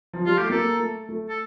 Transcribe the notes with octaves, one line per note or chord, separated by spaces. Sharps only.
F3
G3 F4
A3 G4
A#3 A4
A3
A3
A4